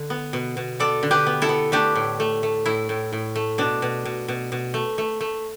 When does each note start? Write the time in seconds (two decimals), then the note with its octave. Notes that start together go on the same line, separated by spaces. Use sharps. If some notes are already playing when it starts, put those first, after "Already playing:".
Already playing: D3
0.10 B3
0.33 B2
0.57 B2
0.80 B3 A4 D5
1.03 D3
1.11 G4 B4
1.26 B3
1.42 E4 A4
1.49 B3
1.72 A3 D4 G4
1.95 A2
2.20 A3
2.43 A3
2.66 A2 E4
2.89 A2
3.13 A2
3.36 A3
3.58 B2 D4
3.82 B2
4.05 B2
4.28 B2
4.52 B2
4.74 A3
4.98 A3
5.21 A3